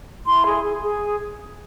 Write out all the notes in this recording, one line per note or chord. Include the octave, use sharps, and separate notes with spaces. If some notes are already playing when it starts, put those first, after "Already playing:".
E4 C6
G#4
G#4
G#4